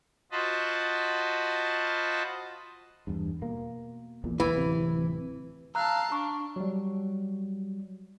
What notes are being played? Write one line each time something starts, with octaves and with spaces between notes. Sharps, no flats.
F4 F#4 C5 D#5 A5 B5
E2 G2
B2 A#3
A#1 E2 A#2
E3
D1 C3
F5 A5 A#5 E6 F#6
D4 C#6
F#3 G3